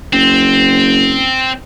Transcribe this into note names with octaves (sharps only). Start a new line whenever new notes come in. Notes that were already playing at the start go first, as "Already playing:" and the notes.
F#1 C4